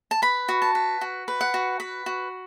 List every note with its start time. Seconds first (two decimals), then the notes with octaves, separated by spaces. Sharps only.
0.11 A5
0.22 B4 B5
0.49 F#4
0.62 A5
0.75 B4
1.01 F#4
1.28 B4
1.41 F#5
1.54 F#4
1.80 B4 B5
2.06 F#4